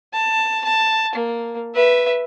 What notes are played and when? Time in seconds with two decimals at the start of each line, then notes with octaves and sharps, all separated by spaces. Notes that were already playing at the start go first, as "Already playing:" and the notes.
0.13 A5
0.64 A5
1.15 A#3
1.75 B4 E5